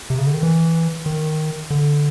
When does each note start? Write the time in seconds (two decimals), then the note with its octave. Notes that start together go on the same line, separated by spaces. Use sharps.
0.10 C3
0.18 C#3
0.27 D3
0.34 D#3
0.43 E3
1.06 D#3
1.70 D3